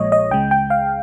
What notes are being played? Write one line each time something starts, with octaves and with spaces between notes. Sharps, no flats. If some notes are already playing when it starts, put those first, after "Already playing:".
Already playing: A#1 A#2 F3 G#3 C#5 D#5
D#5
C#2 C#3 G#3 G5
G5
F5